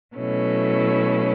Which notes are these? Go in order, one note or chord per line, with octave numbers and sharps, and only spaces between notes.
B2 F#3 A3 C#4 E4